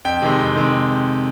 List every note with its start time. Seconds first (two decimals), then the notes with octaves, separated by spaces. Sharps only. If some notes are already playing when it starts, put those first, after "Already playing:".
0.05 F2 G5
0.22 C3 D#3 G#3
0.39 F2
0.56 C3 D#3 G#3